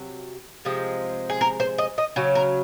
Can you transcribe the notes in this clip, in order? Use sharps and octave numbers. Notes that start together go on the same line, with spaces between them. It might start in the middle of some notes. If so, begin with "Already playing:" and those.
Already playing: C3 F#3
C3 F3 G#3
G#4
A#4
C5
D#5
D#5
C#3 F#3
A#4